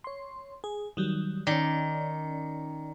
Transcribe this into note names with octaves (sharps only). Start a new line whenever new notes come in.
C#5 C6
G#4
D#3 F#3 G3
D#3 C#4 D5